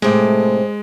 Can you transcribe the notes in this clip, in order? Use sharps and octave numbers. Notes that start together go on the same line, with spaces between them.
A2 C3 G#3 A3